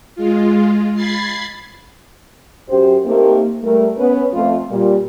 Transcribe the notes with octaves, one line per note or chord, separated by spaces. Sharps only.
G#3 F4
B5 G#6 A6 C7
F#2 G4 C5
A3 A#3 C4 D#4 G4 A#4
G3 A3 A#4
B3 C#4 B4
F2 A3 F4
A#2 G3